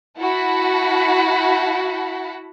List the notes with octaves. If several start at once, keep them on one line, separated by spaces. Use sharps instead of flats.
E4 F#4 F#5 A5 B5